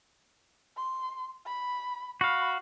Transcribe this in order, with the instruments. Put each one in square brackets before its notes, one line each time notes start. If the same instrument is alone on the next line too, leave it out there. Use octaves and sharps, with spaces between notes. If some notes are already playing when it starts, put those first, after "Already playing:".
[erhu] C6
B5
[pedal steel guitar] F#4 F5 [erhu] B5